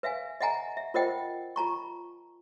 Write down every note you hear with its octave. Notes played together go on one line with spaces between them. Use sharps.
B4 E5 F5 G#5
D#5 E5 F#5 G#5 A#5
E5
F4 A#4 C5 D#5 F#5 G5
F4 A5 A#5 C#6